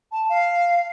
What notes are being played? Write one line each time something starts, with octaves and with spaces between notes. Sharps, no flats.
A5
F5